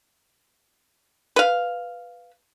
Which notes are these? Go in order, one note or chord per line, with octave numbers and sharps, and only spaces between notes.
B4 F5